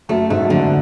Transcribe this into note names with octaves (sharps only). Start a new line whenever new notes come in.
F#2 A3
G#2 A3
F#2
F2 D3